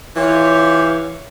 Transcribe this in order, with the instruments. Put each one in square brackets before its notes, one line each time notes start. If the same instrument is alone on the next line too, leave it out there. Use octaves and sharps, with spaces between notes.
[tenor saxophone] E3 [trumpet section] F4 G4 [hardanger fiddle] C#5 F5